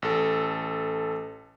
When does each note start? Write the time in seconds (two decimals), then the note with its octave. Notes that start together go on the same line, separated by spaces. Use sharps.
0.02 A1 A4